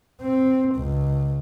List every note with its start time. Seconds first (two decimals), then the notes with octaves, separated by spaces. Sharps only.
0.22 C4
0.76 C#2